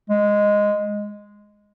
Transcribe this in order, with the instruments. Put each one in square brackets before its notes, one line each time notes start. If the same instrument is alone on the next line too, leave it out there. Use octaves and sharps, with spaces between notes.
[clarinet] G#3